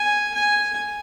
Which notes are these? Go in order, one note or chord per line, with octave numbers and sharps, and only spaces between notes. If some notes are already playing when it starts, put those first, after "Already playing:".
Already playing: G#5
G#5